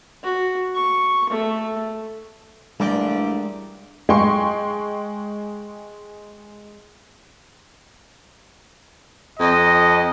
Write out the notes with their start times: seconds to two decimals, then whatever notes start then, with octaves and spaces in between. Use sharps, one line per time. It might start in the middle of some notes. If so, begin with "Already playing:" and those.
0.23 F#4
0.75 C#6
1.30 A3
2.80 A1 G2 G#3 D4 A#4 D5 G5
4.09 G#3 G5 C6 C#6
9.40 F2 D#5